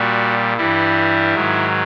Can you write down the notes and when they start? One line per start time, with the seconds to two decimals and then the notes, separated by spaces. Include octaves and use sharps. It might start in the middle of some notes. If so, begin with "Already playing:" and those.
Already playing: A#2 G3 F#4
0.57 G2 E3 G3 E4
1.35 G#2 D#3 F#3